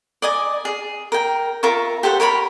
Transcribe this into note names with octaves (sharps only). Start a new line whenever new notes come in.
D5 D#5 G#5
G#4
A#4 G5
F4 A#4 E5 C#6
G4 A4 C5 F#5
A#4 C#5 G#5 B5